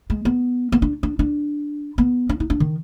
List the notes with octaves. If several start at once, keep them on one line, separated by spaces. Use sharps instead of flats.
G#3
B3
B3
D4
D4
D4
B3
D4
D#4
D4
D#3